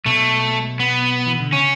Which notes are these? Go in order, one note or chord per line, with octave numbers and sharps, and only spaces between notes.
B1 B2 A3
B3
E3
D3
C#3 C#4